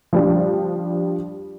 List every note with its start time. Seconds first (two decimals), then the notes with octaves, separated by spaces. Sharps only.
0.13 F3 G3 D4